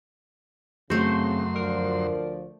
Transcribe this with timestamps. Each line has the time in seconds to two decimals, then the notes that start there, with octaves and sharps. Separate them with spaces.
0.90 F#2 C#3 A3 C4 F#4 C5 C6
1.56 D2 F3 A#4 D5